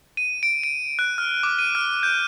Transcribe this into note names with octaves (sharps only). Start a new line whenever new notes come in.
D#7
D7
D7
F#6
F6
D6
D#7
F6
G6